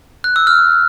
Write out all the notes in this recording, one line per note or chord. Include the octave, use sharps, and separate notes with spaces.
F#6
E6
F6